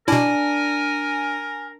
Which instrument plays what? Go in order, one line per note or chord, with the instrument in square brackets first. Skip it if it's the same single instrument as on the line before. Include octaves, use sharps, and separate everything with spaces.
[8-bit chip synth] B2 E4 [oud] D4 [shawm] A#4 [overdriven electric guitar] G#5